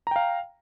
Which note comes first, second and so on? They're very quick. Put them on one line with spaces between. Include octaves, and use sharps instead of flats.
A#5 G5 F5